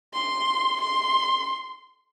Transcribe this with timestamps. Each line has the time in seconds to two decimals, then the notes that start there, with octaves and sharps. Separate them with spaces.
0.14 C6
0.81 C6